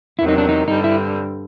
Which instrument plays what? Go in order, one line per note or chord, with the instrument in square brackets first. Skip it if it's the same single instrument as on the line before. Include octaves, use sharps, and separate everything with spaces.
[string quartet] E2 C3 D#3 F#3 [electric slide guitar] E4
[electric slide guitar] D#4
D4
D#4
[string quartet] G2 D3 G3 C4 [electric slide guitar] D#4
[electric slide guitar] E4